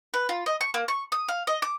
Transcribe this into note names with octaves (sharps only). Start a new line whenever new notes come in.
B4
F4
D#5
C#6
A#3
C#6
D#6
F5
D#5
D6